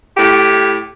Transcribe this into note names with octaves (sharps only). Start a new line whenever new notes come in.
A2 G4